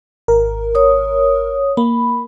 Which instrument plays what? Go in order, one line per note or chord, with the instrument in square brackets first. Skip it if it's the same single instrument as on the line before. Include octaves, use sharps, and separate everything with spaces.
[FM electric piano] G#1 A#4
[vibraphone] C#5 D#6
[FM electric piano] A#3 [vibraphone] B5